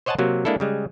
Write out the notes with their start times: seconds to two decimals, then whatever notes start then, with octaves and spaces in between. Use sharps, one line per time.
0.06 C5 C#5 D#5 F#5 G#5 A5
0.19 C3 F#3 A#3
0.45 G#3 A#3 D4 E4 A4
0.60 C#3 G3 G#3